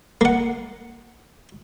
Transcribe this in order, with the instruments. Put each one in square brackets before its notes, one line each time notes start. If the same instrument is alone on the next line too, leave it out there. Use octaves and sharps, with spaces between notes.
[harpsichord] A#3 F#5